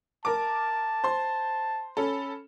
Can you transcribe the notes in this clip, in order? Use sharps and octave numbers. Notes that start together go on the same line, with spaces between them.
A#4 A5 D6
C5 C6
C#4 A4 B5